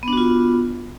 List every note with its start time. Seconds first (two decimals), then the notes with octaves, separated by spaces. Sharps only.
0.03 B3
0.08 D4
0.13 F#4
0.17 F4